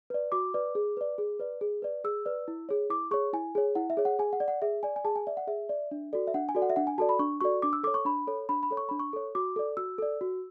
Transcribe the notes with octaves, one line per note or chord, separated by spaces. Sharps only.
B4 D5
F#4 D6
B4 D5
G#4
B4 D5
G#4
B4 D5
G#4
B4 D5
G#4 E6
B4 D5
E4
G#4 C#5
E4 D6
G#4 C#5 C#6
E4 G#5
G#4 C#5
E4 F#5
E5
G#4 C#5
F#5
G#4 G#5
F#5
D5
F#5
G#4 E5
D5 G#5
G#5
G#4 A5
G#5
D5 E5
F#5
G#4 E5
D5
D4
F#4 A4 D5
E5
D4 F#5
G#5
F#4 A4 D5
F#5
E5
D4 F#5
G#5
F#4 A4 D5 A5
B5
D4 C#6
F#4 A4 D5 C#6
D4 D6
E6
A4 C#5 D6
C#6
D4 B5
A4 C#5
D4 B5
B5
A4 C#5
C#6
D4 B5
C#6
A4 C#5
F#4 D6
A4 D5
F#4 E6
A4 D5
F#4